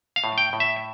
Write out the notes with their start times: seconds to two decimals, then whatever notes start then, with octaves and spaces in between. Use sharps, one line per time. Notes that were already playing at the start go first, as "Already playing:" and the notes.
0.16 F5
0.24 A2
0.38 G5
0.53 A2
0.60 E5